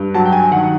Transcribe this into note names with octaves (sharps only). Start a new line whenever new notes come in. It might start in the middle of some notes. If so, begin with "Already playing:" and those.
Already playing: G2
F#3 A5
G5
G#5
D#3 F#5